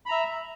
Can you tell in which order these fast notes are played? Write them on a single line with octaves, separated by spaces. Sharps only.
B5 A#5 E5